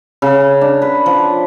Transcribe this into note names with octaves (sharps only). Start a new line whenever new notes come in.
C#3
D4
B4
F3